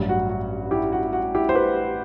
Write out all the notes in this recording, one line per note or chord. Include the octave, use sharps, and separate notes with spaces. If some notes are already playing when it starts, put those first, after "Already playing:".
Already playing: A1 G2 F#3
F#4
F#4
E4 G4
F#4
F#4
E4 G4
C5
G4 B4